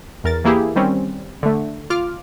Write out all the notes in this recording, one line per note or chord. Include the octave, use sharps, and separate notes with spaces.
E2 A#4 A6
E3 A#3 E4 G4 G#4
D#3 G3 C4 C#4
D3 A3
F4 D6 F6